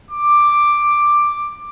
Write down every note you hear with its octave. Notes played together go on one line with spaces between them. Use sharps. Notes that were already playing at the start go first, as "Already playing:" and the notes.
D6